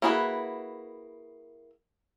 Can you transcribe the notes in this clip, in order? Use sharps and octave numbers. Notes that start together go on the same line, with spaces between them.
A#3 E4 F#4 G#4 B4